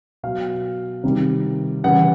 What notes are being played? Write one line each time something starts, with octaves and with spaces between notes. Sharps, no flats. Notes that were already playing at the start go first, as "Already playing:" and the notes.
B2 F#3 F5
C3 D#3 G3
C#3 E3 G3 F#5